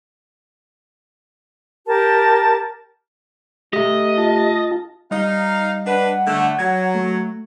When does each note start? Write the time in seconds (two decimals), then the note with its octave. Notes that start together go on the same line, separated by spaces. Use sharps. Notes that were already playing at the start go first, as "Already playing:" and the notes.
1.87 G4 A#4 A5
3.73 A3 G4 D#5 E5
4.18 F4 A5
5.11 G3 D#4 D#5 F5
5.86 D4 B4 F#5
6.27 D3 A3
6.59 F#3 G#6
6.95 A3